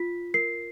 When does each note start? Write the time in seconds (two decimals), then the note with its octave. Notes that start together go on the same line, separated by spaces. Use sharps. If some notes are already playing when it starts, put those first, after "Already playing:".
Already playing: F4 B6
0.34 A#4 C7